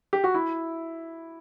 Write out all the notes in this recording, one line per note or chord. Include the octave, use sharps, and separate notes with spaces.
G4
F#4
E4